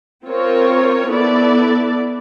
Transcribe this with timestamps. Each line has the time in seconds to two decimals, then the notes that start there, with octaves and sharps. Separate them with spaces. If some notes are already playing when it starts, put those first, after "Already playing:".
0.24 C4 F4 A#4 C#5
1.08 B3 E4 A4 D5